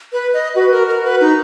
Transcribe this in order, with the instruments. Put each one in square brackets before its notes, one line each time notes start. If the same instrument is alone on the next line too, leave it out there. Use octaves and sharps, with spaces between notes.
[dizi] B4
D#5
[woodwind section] F#4 [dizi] B4
[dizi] A#4
A#4
B4
D#4